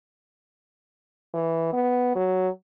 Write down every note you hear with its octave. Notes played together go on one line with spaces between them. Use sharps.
E3
B3
F#3